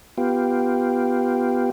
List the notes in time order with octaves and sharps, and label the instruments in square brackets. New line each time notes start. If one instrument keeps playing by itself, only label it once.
[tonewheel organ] B3 F4 G4